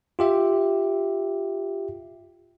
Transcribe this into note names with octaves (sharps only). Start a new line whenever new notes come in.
F4 G4 E5